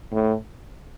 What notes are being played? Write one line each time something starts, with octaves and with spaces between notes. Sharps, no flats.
A2